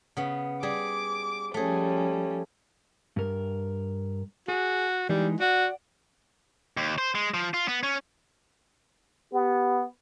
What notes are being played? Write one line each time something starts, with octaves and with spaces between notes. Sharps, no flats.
C#3 B3
G3 G#4 D6
F3 G3 A3 C#4 G#4
G2 A#4
F#4 G#4
E3 G3 G#3 D#4
F#4 D5 F#5
D#2
C5
G#3
F3
F4
B3
C#4
B3 G4